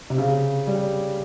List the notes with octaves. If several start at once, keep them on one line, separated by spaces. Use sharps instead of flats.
C3
C#3
G3